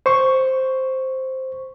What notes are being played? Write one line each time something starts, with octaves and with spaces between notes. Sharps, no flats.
C5 C#6